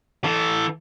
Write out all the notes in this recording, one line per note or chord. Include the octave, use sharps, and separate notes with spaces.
E3 A4